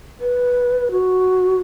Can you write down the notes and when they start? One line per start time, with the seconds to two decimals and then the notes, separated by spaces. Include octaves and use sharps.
0.21 B4
0.91 F#4